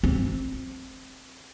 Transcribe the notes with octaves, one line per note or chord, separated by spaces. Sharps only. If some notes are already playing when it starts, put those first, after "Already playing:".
C4